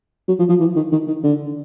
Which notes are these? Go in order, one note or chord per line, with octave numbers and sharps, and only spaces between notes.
F#3
F3
F3
E3
D#3
D#3
D#3
D3